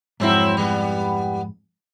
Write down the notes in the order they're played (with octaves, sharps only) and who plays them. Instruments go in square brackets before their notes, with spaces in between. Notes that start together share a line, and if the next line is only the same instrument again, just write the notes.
[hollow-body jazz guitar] F2 G#2 [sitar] F#3 C4 E4
[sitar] G3 B3